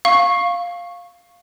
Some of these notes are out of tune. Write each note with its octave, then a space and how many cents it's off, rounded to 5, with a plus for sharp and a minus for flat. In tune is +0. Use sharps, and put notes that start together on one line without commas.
F5 +5 C#6 -10